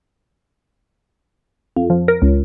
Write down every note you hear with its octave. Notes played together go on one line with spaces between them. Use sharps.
F2
F3
A#4
C#2